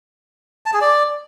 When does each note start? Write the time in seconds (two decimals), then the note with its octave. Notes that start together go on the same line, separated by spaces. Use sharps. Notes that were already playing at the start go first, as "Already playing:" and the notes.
0.66 A5
0.74 G#4
0.81 D5